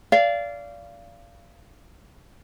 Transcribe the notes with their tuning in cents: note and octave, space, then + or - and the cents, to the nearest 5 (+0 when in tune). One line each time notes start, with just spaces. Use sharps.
D5 -25 F5 -20